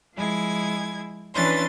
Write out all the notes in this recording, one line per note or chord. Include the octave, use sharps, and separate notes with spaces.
F3 G#3 E4 G#5 G#6
E3 C#4 D4 B4 C6 A6